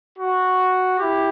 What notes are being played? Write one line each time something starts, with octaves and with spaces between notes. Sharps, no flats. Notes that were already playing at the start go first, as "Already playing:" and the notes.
F#4
E4 G4